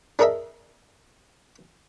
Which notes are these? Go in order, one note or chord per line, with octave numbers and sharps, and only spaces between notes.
D4 G#4 A#4 D#5 E5